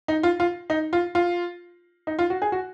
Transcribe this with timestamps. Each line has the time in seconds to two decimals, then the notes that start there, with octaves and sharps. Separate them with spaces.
0.08 D#4
0.23 F4
0.40 F4
0.70 D#4
0.93 F4
1.15 F4
2.07 D#4
2.19 F4
2.30 F#4
2.42 G#4
2.52 F#4